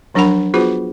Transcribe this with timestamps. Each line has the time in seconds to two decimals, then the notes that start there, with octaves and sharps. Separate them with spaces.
0.14 F3 F#3 D4 A#4 F#5 B5
0.54 B3 F4 F#4 G#4 B4 C5